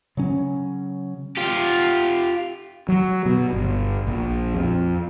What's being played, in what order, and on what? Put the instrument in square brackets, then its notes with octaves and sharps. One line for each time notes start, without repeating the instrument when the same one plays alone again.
[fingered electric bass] C#3 F#3 C#4
[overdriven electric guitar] F4 G4
[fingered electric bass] F#3
B2
G1
A#1
F2